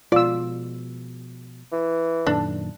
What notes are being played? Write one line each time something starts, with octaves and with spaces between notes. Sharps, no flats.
B2 F3 G#3 F4 D5 E6
E3
F#2 A#2 D#3 D4 A4